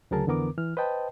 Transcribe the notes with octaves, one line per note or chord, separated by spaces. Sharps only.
D2 C#3 F#3 G#4 A#4 A5
F2 D3 E3 B3 A#4 D6
E3 F6
B4 C5 D#5 G5 A5